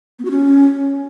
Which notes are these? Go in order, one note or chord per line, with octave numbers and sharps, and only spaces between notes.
B3
F#4
C#4